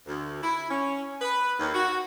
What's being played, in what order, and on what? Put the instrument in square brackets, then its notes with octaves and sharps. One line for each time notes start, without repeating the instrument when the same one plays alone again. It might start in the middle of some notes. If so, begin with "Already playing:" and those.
[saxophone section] D2
E4
C#4
B4
D#2
F#4